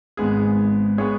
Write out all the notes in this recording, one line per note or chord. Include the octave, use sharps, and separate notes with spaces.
G#1 G#2 G#3 B3 G#4
G#3 B3 G#4 C#5